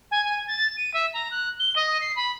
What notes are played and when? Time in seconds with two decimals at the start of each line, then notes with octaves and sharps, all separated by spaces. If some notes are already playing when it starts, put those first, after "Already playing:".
0.11 G#5
0.24 G#5
0.47 A6
0.77 D#7
0.94 E5
1.13 A#5
1.31 F#6
1.59 G7
1.76 D#5
2.01 C7
2.16 B5